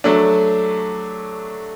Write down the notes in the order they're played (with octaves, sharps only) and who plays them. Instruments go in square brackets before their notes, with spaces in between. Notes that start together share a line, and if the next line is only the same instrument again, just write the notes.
[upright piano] F#3 A3 D4